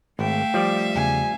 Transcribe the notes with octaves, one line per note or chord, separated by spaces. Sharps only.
G#1 A3 E5 F5 G5
F3 G3 D5
E2 C#3 G#5